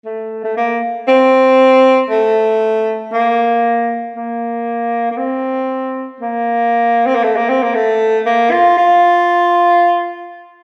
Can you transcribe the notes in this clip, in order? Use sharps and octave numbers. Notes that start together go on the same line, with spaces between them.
A3
A3
A#3
C4
A3
A#3
A#3
A#3
C4
A#3
C4
A#3
A3
A#3
C4
A#3
A3
A#3
F4
F4